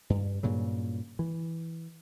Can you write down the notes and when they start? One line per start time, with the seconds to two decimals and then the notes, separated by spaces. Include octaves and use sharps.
0.10 G2
0.43 G2 A#2 C#3 F#3
1.19 E3